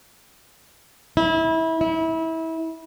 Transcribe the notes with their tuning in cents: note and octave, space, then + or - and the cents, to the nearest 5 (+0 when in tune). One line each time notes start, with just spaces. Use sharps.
E4 -25
E4 -25